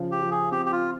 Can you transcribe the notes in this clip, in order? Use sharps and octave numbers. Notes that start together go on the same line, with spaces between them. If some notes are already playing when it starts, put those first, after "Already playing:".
Already playing: C#3 F3
G4
F3
G#4
C4 G4
G4
F4